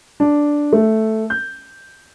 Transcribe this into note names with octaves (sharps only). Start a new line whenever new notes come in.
D4
A3
G6